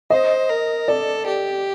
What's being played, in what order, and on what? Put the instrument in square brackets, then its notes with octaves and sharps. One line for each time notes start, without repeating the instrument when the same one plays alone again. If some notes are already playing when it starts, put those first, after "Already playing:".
[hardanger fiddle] C5 [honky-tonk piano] D#5
[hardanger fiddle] A#4
[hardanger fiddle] A4 [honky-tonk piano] D5
[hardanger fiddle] G4